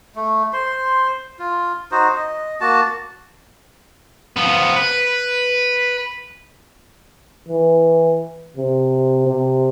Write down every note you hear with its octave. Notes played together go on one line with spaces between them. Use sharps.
A3
C5 C6
F4
D#4 F#4 C5
D#5
A#3 F#4 A5
F3 B3
B4
E3
C3
C3